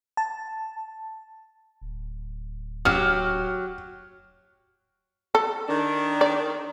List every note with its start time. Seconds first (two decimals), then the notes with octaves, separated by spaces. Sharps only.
0.17 A5
1.81 D1
2.85 F#3 G4 F6
5.35 A4
5.68 D#3 D4
6.21 D5